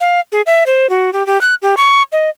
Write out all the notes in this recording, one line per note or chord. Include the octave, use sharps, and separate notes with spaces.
F5
G#4
E5
C5
F#4
G4
G4
F#6
G4
C#6
D#5